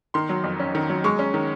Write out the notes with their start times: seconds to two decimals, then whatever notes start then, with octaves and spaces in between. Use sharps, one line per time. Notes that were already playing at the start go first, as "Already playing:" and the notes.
0.14 D#3 C6
0.29 F#3
0.44 F2
0.60 C#4
0.75 D#3
0.90 F#3
1.04 G#3 C#6
1.19 C#4
1.34 D#3